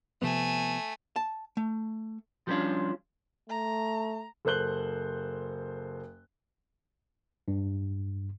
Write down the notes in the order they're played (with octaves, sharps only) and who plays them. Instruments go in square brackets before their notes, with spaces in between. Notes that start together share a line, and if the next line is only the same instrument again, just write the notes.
[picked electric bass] C3 F3 B3 [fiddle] A3 G#5
[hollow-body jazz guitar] A5
A3
[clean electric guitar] F3 G3 B3 C#4 D4 F4
[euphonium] A3 [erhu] A#5
[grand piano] F#1 A4 C5 F#6 G7
[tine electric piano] G2